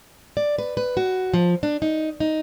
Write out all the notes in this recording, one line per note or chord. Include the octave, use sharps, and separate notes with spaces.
D5
B4
B4
F#4
F3
D4
D#4
D#4